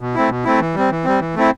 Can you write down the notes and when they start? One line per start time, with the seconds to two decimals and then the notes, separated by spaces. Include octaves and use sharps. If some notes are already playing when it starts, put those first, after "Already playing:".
0.01 B2
0.14 A3 C4 E4
0.30 B2
0.45 A3 C4 E4
0.61 E3
0.75 G3 C4
0.91 E3
1.05 G3 C4
1.20 E3
1.35 A3 C4 E4